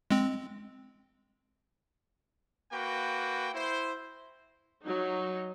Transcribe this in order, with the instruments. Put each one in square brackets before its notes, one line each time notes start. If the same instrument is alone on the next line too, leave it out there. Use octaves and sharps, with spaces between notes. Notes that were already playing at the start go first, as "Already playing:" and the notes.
[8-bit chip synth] G#3 C4
[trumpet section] A#3 F#4 B4 G5
E4 C5
[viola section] F#3 D#4